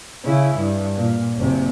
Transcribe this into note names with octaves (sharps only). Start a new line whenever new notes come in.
C#3 E4
G2
A#2
F#1 C3